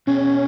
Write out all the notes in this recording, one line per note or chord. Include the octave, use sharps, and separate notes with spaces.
B2 B3 C#4 G#4